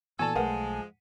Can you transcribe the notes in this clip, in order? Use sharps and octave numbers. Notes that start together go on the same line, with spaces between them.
A#2 E3 B3 F#4 A4 D5 G#5 A5
B1 F3 G#3 A3 A#4 B4 F#5